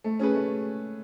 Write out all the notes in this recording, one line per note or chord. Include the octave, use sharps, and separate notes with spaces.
A3
C#4 G#4 B4
A3